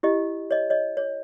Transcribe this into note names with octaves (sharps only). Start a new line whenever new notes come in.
E4 G4 D#5
C#5 D#5
C#5 D#5
C#5